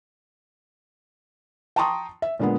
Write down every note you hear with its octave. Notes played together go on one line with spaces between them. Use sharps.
G5 A5 A#5 C6 C#6 D#6
E5
A#2 D3 G#3 A#3 B3